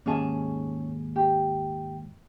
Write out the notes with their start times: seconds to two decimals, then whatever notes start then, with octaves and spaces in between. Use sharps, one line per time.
0.06 D#2 G#2 C#4 G#4 A5
1.16 G4